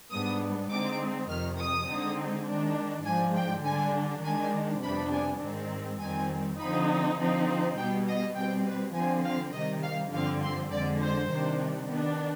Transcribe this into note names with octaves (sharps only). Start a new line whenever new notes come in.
G#2 G3 B3 D4 D#6
D3 G#3 C4 D#4 D6
F2 C3 D#3 F6
D#6
D3 G#3 C4 D#4
D#3 G#3 D4
G#2 F3 G#3 D4 G#5
G5
D3 G3 D4 G#5
D#3 G#3 D4 G#5
F2 C3 G3 B3 D4 B5
G#5
G#2 D#3 G#3 C4
F2 D#3 G3 C4 G#5
D3 F3 C4 D#4 B5
D3 F3 C4 D#4
B2 G3 B3 G5
D#5
B2 G3 C4 G5
B4
D3 F3 C4 G#5
F5
C3 D#3 G3 D#5
F5
G2 D3 F3 C4 F5
C6
F2 D3 G#3 D5
C5
C3 D#3 G3 D4
D#3 B3 D4